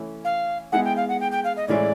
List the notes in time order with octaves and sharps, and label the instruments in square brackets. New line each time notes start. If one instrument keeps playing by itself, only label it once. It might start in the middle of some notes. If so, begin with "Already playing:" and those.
Already playing: [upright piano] E3 A3 C#4 E4
[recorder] F5
[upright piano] G#3 B3 E4 G#4 [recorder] F#5
[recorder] G5
F5
F#5
G5
G5
F5
D#5
[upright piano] A2 E3 G#3 C#4 E4 [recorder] D5